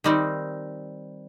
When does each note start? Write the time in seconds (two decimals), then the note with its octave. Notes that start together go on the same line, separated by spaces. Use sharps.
0.04 D#3 G3 C4 D#4